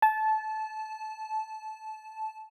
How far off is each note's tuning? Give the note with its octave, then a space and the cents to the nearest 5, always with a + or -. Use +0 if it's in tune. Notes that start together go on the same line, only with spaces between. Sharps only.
A5 -20